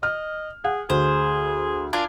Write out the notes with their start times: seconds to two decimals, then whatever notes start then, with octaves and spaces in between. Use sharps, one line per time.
0.03 D#5 F6
0.64 G#4 F#5
0.90 D2 G#4 C5
1.93 D4 F4 A#4 G#5